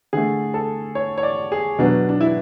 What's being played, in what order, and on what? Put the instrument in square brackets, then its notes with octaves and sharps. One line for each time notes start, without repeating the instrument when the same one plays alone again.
[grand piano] D3 A3 G#4
A4
C#5
C#5
D5
G#4
B2 F#3 B3 D4
D4
E4